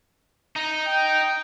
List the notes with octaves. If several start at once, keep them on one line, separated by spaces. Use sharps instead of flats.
D#4
G5